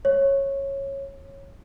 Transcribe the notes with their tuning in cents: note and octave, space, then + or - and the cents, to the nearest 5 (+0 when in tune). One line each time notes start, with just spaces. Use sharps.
C#5 -15